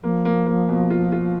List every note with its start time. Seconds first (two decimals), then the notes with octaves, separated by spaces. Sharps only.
0.02 F3 A#3
0.25 A#3
0.46 A#3
0.69 B2
0.90 F4
1.12 F4